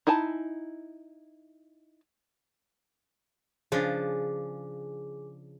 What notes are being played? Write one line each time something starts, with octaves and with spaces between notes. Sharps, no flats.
D#4 E4 G#5 A5
C#3 F3 D4 G#4